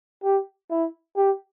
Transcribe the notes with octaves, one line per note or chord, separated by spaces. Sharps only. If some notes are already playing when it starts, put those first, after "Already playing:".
G4
E4
G4